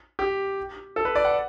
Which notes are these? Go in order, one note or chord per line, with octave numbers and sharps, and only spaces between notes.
G4
A4
B4
D5
F#5